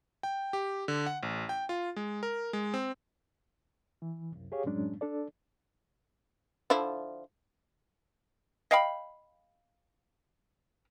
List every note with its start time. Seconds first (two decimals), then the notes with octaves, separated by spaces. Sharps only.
0.23 G5
0.53 G4
0.88 D3
1.06 F#5
1.23 A1
1.49 G5
1.69 F4
1.96 G#3
2.23 A#4
2.53 G#3
2.74 C4
4.02 E3
4.32 C2 F#2
4.52 G4 G#4 C#5 F5
4.65 F#2 A2 F#3 G#3 C#4 D4
5.01 D4 A4 D5
6.70 D3 F3 E4
8.71 D#5 F5 G5 B5